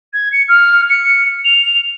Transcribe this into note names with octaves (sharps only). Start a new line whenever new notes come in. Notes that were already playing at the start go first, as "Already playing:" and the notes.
G#6
C#7
F6
C#7
F7